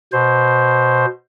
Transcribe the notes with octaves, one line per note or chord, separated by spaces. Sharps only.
B2 C5